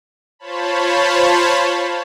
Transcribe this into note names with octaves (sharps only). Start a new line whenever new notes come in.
F4 C5 C#5 A5 B5